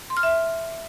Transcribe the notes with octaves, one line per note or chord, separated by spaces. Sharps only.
C6
F6
E5